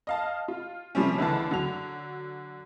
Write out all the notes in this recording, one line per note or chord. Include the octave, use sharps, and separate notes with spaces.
D#5 F5 A5
F4
C3 F3 G3 C4 C#4
C#2 D3 E3 A5
D3 F#3 F7